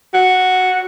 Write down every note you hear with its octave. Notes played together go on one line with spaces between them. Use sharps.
F#4